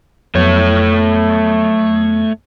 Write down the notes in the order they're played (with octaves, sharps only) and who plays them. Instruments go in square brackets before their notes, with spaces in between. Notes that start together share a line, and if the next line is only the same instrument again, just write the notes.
[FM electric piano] F2 F#3 B3 [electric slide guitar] A3 C#5